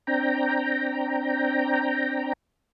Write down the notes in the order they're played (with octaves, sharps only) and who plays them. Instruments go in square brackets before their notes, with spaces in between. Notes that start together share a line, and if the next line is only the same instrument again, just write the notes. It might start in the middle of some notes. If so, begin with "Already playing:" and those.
[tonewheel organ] C4 D4 G5 A#5